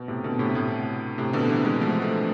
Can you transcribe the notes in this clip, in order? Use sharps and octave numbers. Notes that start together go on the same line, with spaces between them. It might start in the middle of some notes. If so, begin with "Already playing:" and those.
Already playing: B2
A2 C3
B2 D3
A2 C3
A2 C3
A2 C3
B2 D3
C3 E3
E3 G#3
F3 A3
A3 C4